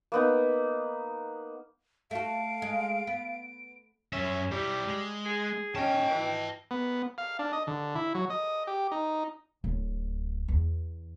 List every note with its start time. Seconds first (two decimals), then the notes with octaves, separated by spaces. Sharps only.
0.12 A#3 B3 D#4
2.11 A3 F#4 F5 D7
2.62 G#3
3.07 B3
4.13 F#2 C#4 E5
4.52 G3 E4 G4
4.87 G#3
5.25 G#4
5.75 C#4 D#5 G5 A5
6.10 E3
6.71 B3
7.18 F5
7.39 D4
7.53 D#5
7.67 D3
7.95 E4
8.15 F#3
8.30 D#5
8.67 G4
8.92 D#4
9.64 D1
10.48 E2